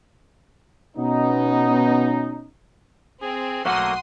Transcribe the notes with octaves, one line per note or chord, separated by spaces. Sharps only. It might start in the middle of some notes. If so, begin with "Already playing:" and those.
B2 B3 C#4 D#4
C4 G#4
B1 F#3 A3 A#3 F#4 F#5 C6 D#6